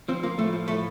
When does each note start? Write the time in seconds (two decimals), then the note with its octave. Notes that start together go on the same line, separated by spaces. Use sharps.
0.08 F3 C4
0.23 F3 A#3
0.38 A2 A3
0.53 F3
0.68 A2 A3